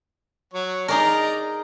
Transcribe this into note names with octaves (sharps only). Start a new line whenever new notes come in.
F#3 C#5
D#4 G#4 A#4 D5 D#5 A#5